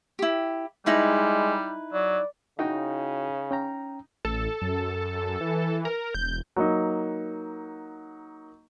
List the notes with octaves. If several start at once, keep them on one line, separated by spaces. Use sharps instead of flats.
E4 G4
G3 G#3 D#4 E4 B4
F#3 D5
C#3 D#4 E4 F#4 G5
C#4 G5 A#5
A1 A4
F#2
E3
A#4
E1 G6
F#3 A#3 D#4